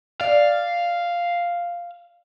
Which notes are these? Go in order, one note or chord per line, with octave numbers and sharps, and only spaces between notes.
D5 F5